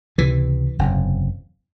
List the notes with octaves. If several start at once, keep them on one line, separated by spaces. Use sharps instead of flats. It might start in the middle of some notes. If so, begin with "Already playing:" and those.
C#2 C3 E3
F#1 E2 C3